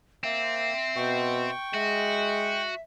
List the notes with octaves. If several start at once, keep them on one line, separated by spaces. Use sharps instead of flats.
A#3 C4 E5
B2 G5 C#6
G#3 F#4 E5